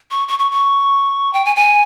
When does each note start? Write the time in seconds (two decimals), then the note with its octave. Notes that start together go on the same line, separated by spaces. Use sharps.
0.11 C#6
0.28 C#6
0.39 C#6
0.51 C#6
1.33 G5
1.45 G#5
1.56 G#5